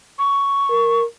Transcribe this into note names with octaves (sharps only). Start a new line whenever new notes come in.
C#6
A#4